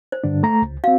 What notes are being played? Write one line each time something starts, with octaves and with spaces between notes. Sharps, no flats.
C5
G2 D3 D4
A3 A#5
C#2
C4 F#4 F5